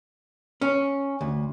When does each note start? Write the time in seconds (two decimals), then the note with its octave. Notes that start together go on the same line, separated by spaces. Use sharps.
0.61 C#4
1.21 D2